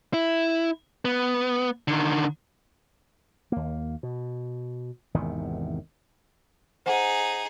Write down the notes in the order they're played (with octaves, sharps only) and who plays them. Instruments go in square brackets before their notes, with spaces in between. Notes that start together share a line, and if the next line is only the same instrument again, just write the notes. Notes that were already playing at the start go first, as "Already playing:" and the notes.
[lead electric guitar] E4
B3
D3 D#3
[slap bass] D#2 A#3
B2
G#1 E2 C3 D#3
[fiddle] D#4 G#4 [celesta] C5 F#5 G#5